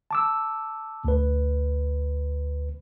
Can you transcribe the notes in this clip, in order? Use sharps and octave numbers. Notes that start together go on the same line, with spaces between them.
A5 D6 E6
D2 B4